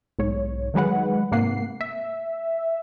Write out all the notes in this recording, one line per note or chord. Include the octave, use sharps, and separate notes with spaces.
B1 G#2 C#5
D#3 F#3 G#3 B4 F#5
G#2 C3 A#3 F#5 C7
E5